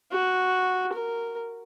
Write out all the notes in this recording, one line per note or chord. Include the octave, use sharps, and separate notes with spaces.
F#4
A#4